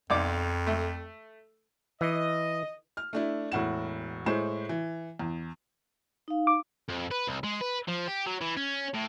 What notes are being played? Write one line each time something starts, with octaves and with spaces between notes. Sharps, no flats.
B1 F2 D5 D6
A3
E3 D#5
F6
A3 D4 E4
E1 A2 F#5 E7
A2 G#3 C5 E7
E3
E2
D#4 F5
D6
F2
B4
C2
G#3
B4
F3
G4
F#3
E3
C#4
A2